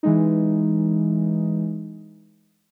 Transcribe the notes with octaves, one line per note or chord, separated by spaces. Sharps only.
E3 G#3 D#4